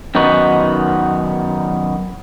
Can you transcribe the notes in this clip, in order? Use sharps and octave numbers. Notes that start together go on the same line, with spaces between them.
F#2 D#3 B3 D#4 F#4